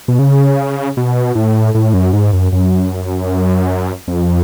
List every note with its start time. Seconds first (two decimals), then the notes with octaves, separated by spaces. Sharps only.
0.08 B2
0.19 C#3
0.97 B2
1.35 A2
1.74 A2
1.94 F#2
2.13 G#2
2.33 F#2
2.52 F#2
4.08 F2